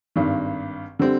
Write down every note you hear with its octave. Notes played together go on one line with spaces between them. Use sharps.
G#1 G2 D#3
D3 G3 C4